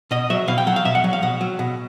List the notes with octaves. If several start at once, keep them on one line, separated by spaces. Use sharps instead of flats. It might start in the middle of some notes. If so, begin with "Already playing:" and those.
B2 D#5
F#3 E5
B2 F5
G5
F#3 F#5
F5
B2 E5
F#5
F#3
F5
B2 F#5
F#3
B2